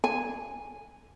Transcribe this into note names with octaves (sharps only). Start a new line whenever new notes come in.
G#5